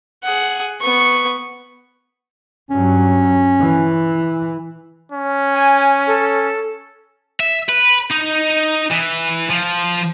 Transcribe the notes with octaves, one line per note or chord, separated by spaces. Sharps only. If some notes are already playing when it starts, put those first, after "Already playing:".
G#4 F#5
B3 C#6
G2 F#3 C#4
E3
C#4
G#5
A4
E5
B4
D#4
E3
F3